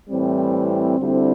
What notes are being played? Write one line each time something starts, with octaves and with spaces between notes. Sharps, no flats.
A2 E3 G3 C4
D2 D3 G3 C4 E4